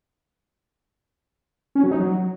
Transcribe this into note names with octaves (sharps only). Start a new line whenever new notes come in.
C#4
F#3
D#4
F#3